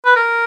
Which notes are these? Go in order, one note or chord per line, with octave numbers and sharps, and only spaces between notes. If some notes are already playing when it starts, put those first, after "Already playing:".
B4
A#4